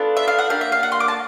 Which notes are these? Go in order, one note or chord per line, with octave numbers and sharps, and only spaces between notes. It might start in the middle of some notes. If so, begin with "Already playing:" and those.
Already playing: B3 D4 F4 A4
E5
F5
F#5
A#3 D4 G4 F5
E5
F5
F#5
C6
D6
A5